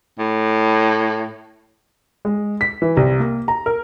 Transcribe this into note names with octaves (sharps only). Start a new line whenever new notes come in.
A2
G#3
B6
E3
C2
A#3
A#5
A#4